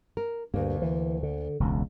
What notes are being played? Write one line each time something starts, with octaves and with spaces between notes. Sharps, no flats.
A#4
D2 G2 A#3
E3
D3
E1 C#2